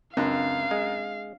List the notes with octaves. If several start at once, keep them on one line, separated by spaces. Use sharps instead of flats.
C#2 F#2 C4 D4 F5
G#3